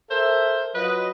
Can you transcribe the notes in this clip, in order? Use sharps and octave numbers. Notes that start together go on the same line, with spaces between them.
A4 A#4 C5 E5
F#3 F4 B4 D#5